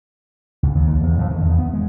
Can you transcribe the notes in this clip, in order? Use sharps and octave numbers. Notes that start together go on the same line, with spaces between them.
C#2
D#2
D#2
E2
F2
D#3
E2
B3
G#3